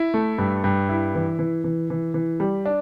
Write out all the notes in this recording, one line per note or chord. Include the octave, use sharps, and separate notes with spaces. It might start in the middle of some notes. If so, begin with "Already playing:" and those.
Already playing: E4
A3
G2
G2
E4
E3
E3
E3
E3
E3
G3
D4